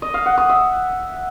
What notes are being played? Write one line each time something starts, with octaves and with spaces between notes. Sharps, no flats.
D#5
F5
F#5
D#6
E5